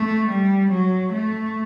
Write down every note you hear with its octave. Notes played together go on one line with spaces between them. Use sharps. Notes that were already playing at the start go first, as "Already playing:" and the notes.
Already playing: A3
G3
F#3
A3